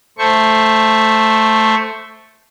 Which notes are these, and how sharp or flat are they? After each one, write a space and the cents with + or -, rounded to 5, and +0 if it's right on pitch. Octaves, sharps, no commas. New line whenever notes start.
A3 +0 C5 +0 C#6 +0